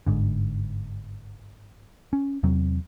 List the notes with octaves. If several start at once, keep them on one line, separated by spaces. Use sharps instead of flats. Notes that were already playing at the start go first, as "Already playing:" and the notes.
G1 G#2 D3
C#4
E2 C3 F#3 C4